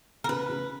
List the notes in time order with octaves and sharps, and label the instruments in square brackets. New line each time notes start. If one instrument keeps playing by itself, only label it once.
[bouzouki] A#4
[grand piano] C#3 [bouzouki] B4
[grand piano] C#3